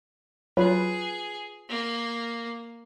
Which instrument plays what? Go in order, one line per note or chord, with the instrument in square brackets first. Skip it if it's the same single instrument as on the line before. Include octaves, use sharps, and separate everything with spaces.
[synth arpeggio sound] F#3 [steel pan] F4 B4 [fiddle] G#4
[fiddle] A#3